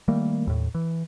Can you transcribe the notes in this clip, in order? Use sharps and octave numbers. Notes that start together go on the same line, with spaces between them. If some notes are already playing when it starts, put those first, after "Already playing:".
D#3 G3 A3 A#3
D#2 A2
E3